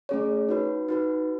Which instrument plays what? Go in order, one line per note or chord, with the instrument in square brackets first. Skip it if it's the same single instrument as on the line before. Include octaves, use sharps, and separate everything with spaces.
[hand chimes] A3 C#4 G#4 C#5
D#4 F#4 B4
D#4 F#4 B4